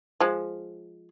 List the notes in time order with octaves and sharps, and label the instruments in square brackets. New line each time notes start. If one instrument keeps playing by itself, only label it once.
[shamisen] F3 G#3